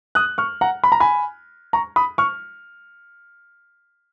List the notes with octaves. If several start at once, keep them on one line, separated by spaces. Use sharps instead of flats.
D#6 F#6
C#6 F6
F#5 A#5
B5
A#5
G#5 B5
A#5 C#6
B5 D#6
C#6 F6